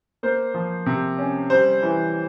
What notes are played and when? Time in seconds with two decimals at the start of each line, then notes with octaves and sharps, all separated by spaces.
0.23 A#3 C5
0.54 F3
0.86 C3
1.18 C#4
1.50 G3 C5
1.83 E3